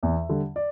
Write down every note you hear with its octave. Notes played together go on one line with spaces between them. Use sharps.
E2 E5
D3 G3
D5